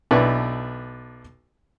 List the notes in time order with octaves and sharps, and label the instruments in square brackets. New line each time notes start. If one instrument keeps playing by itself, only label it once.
[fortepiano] B1 D4 E4 B4 A5 C#6